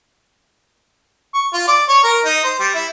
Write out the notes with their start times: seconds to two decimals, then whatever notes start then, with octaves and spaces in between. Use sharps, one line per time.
1.35 C#6
1.53 F4
1.68 D5
1.89 C#5
2.04 A#4
2.25 D#4
2.44 C5
2.60 G3
2.74 E4